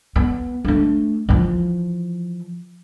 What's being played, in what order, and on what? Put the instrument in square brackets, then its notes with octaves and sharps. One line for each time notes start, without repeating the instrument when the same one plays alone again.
[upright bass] B3
A3 D4
E3 F3